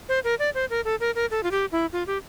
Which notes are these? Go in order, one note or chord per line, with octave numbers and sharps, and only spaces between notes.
C5
A#4
D5
C5
A#4
A4
A#4
A#4
A4
F4
G4
E4
F4
G4